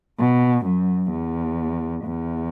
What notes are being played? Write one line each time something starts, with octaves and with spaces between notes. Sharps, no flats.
B2
F#2
E2
E2